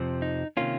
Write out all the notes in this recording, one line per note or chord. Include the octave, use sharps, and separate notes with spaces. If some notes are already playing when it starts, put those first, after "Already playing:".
Already playing: F2 C3 F3 C4
D#4
C3 D#3 A#3 C#4 F4